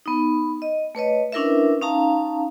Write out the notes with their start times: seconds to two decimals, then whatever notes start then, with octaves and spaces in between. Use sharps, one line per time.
0.06 B3 D#4
0.62 D#5
0.95 A3 B4 C#5 D#5
1.32 C#4 D4 E4 A#4 B4 E5
1.82 C#4 D#4 F5 A5 A#5